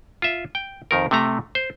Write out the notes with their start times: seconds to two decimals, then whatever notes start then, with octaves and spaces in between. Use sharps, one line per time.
0.22 F4 E5
0.55 G5
0.91 F2 D#3 A#4
1.11 C3 A3 A#5
1.55 C5